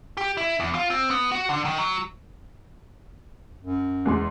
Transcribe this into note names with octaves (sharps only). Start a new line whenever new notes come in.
G4
E4
E2
F4
C4
B3
F#4
D3
D#3
F#3
F#2
E2 G#3 C6